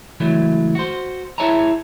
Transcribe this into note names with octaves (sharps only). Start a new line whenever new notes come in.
C#2 E3 F#3 A3
F#4 C5
E4 G#4 C#5 E5 A5 A#5